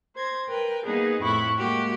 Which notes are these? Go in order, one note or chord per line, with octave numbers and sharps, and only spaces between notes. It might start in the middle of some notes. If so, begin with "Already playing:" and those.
C5 G#6 A#6
A#4 B4 G5
A#3 B3 D#4 G#4 B4
F2 A2 E4 B5 C#6 F#6
G#3 A#3 F#4 G4 G5